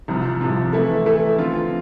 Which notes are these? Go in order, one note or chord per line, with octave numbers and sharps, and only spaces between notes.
C2 C3 F3
C2 C3 F3
E3 A3 E4 A4
E3 A3 E4 A4
D3 F3 C4 F4